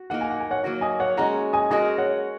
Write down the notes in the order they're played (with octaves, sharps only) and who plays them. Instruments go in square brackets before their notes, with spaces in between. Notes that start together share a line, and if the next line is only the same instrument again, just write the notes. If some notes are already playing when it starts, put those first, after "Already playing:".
Already playing: [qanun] F#4
[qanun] A#3 D#4 A#4 [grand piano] F#5
[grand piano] G#5
F#5
G#5
C#5 F#5
[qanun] F#3 A#3 F#4 A#4
[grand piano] D#5 G#5
C#5 F#5
[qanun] G#3 C#4 F#4 [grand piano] F#5 A#5
[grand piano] D#5 G#5
[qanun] G#3 F#4 A#4 [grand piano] D#5 G#5
[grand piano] C#5 F#5